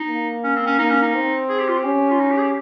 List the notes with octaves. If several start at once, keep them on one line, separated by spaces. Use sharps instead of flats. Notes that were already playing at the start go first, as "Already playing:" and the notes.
Already playing: D#4
A#3
C#4
C4
C#4
A#3 D#4
C#4
D#4
C4
G#4
G4
F4
G4
C#4
F4
D#4
G4
G#4
G4